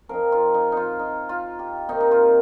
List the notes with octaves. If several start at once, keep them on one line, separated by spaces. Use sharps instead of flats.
F3 C4 D#4 A#4
F4
D#4
D#4 F4
D#4
F4
G4
C3 D#3 A#3 D#4
D#4
F4